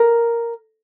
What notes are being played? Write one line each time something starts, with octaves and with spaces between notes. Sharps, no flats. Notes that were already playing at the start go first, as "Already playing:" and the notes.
Already playing: A#4